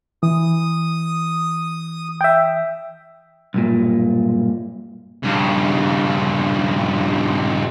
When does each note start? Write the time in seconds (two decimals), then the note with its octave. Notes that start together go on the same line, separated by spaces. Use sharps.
0.23 E3 D#6
2.21 E5 G5
3.54 B1 G2 A#2
5.23 G2 C#3